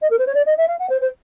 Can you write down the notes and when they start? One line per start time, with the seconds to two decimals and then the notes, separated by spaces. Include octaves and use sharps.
0.02 D#5
0.10 A#4
0.18 C5
0.26 C#5
0.34 D5
0.46 D#5
0.57 E5
0.68 F5
0.79 F#5
0.89 C5
1.01 C5